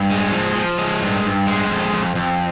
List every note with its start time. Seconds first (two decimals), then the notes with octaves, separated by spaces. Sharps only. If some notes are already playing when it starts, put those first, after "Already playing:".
Already playing: G2
0.10 G#3
0.32 F3
0.55 F3
0.78 G#3
1.01 G2
1.24 G2
1.47 G#3
1.70 F2
1.93 F2
2.15 F2